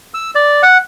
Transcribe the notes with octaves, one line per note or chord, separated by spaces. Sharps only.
E6
D5
F#5